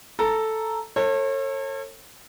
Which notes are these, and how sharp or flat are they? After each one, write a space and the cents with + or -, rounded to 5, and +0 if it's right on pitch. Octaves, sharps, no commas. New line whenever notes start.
A4 +0 A#5 -5
A4 +35 C#5 -35